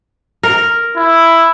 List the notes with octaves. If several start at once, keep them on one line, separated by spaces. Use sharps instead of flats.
A#4
E4